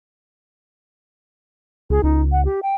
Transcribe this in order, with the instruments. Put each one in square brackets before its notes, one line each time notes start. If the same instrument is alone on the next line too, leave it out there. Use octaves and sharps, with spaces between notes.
[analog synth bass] C#2 [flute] G#4
[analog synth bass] C#2 [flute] D#4
[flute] F#5
G4
G5